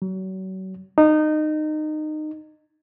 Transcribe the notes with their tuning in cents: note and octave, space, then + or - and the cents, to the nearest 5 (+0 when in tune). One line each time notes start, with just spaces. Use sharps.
F#3 +35
D#4 -20